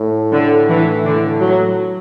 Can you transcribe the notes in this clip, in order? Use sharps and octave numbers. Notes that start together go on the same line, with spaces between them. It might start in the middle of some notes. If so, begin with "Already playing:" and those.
Already playing: A2
D3
E3
D3
F#3